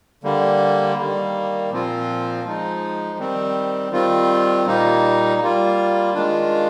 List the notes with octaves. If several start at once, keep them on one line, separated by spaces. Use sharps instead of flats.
D3 G3 A#3
D#3 G3 A#3
A#2 F3 C4 F4
F3 G#3 D#4
D#3 G3 C4
D#3 G3 C4 F4
A#2 G3 A#3 D#4
G3 A#3 F4
D#3 G#3 D4 F4